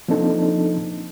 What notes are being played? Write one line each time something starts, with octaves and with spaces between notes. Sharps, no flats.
F3 A#3 C4 D4 D#4 A4